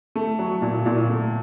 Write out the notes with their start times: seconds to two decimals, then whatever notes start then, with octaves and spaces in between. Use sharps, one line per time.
0.15 A3
0.39 F#3
0.62 A#2
0.86 A#2
1.09 A3